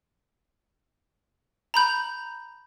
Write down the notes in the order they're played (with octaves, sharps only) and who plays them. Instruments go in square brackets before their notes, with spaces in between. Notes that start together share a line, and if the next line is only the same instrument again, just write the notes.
[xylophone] A#5 B5 G6